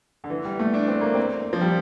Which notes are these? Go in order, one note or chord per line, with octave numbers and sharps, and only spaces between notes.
D3
E3
G3
A3
D4
C4
A#3
C4
F3
G3